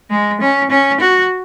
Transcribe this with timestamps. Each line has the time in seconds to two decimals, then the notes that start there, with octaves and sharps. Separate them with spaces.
0.10 G#3
0.41 C#4
0.70 C#4
1.00 F#4